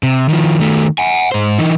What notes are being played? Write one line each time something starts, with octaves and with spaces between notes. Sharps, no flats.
C3
D#3 F3
D#3 A3
F#5 G#5
G#2 C5
E3 D#4